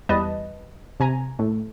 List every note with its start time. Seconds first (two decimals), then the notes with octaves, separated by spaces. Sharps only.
0.09 E2 G3 B4 D#5 A5
1.00 C3 G#5 A#5
1.39 A2